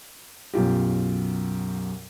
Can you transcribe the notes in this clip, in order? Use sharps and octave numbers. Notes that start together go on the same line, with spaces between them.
B1 F#2 F4 G4